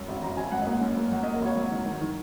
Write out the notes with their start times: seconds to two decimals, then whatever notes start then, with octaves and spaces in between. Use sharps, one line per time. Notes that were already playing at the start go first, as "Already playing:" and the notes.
Already playing: F#2
0.08 G#1
0.22 G#1 A#5
0.37 G#1 G#5
0.51 F#2 F#5
0.62 D#5
0.67 A#3 F#5
0.81 F#2
0.97 A#3
1.11 F#3 F#5
1.23 D#5
1.26 A#3
1.34 A#4
1.41 G#1 C#5
1.56 F#3
1.71 D#3
1.86 D#3
2.01 D#3